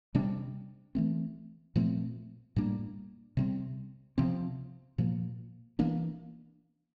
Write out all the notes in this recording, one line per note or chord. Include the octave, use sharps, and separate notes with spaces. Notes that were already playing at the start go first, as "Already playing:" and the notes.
C3 G3 D4
E3 A3 C4
A#2 F3 A3 C4
A2 G3 A#3 D4
C3 G3 C4
C3 F3 C4
A#2 F3 A#3
E3 A#3 D4